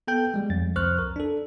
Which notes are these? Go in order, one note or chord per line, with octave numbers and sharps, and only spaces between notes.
B3 A4 G5 G6
G3 G#3
F2 A6
C2 F2 C5 C#6 F6 F#6
A#4
D4 A4